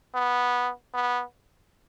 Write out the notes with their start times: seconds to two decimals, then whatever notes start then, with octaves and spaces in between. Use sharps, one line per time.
0.15 B3
0.94 B3